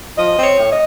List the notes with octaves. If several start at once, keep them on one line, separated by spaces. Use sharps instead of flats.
F3 D#5
C4
C#5
A2
D#5